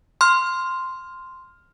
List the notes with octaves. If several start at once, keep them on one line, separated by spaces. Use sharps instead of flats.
C6 F6